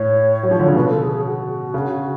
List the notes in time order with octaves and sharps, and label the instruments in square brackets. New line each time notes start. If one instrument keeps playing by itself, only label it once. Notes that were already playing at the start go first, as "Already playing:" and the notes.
Already playing: [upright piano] A2 [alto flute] C#5
[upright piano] F#3
F3
D3
C#3
[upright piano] B2 [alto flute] B4
[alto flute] A4
G#4
G#4
F#4
[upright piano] C#3